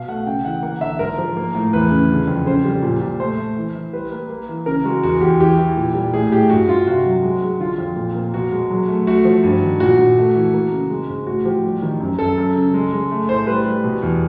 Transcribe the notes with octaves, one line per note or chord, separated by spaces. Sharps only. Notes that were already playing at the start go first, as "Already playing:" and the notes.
Already playing: B2 F5
A3 F#5
C#3 G5
E3 F#5
A#3 F#5
D3 E5
G#2 A#4
F3
A#3
A2
E2 B4
C#3
D3
F2
C#3 C5
G3
A#2
A#2
A3 C5
A3
E3
E3
G3 B4
A#3
A#3
E3
C#3 A#4
G#3 F#4
E2 F#4
E2 G4
E3 G4
E3
A#2
G3
A2 G#4
A2 G4
G2 F#4
G2 F4
C3 F#4
F#3
G#3
G#3
D3 F4
F2
A#2
A#3
B2 F#4
G#3
F#3
A3
A3 F#4
F3
G2
D#3
A#2 F#4
A#2
A3
E3
A#3
C#3
G#3
G#2
A2 F#4
F3 G4
G3
D#3
F#2
F#2 A4
F#2
C#3
G#3
G#3
A3
A2 C5
G3 B4
G3
B2
E2